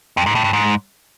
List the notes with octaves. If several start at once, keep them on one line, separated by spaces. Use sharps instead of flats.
F2
G#2
A2
G2
G#2